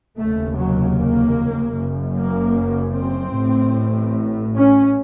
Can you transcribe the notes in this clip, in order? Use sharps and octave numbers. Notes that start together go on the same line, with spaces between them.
F1 D#2 C#3 A3
F#3
A#3
F#1 F#2 C#3
A#3
C4
A1 A2
C#4